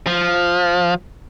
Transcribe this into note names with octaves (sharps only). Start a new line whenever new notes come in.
F3